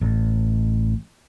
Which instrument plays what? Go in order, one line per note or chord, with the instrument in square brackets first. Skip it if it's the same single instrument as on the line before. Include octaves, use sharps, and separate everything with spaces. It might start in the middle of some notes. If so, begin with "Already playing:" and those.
[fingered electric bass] A1